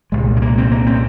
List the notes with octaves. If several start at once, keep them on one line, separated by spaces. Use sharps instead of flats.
C2 A#2 G#3
G#3
A#3
C4
A#3
C4